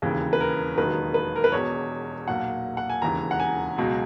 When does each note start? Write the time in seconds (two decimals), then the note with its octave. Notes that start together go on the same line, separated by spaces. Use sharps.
0.02 E1 D#2 C#3 E3
0.33 B4
0.40 A#4
0.77 E1 D#2 D#3 F#3 B4
1.14 B4
1.36 A#4
1.44 B4
1.52 E1 E2 B2 C#5
2.27 B1 A#2 F#3 F#5
2.77 F#5
2.90 G#5
3.02 E1 D#2 C#3 E3 A#5
3.31 F#5
3.40 G#5
3.77 C#2 B2 F#3